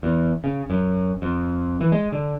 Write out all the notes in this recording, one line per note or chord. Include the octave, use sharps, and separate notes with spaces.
E2
C#3
F#2
F2
E3
G#3
D3